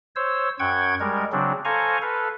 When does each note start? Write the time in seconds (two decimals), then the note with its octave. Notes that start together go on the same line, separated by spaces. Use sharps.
0.16 C5 C#5 E6
0.59 F#2 F#5 G5 C#6 G#6
1.00 G3 G#3 A#4
1.32 C#3 F#3 C4 D4
1.65 A4 C5 F5 G#5 A#5 C#6
2.02 A4 B4 F5